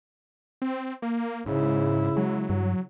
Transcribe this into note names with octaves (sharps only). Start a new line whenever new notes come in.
C4
A#3
G#2 C#3 E4
F#3 G#3
G2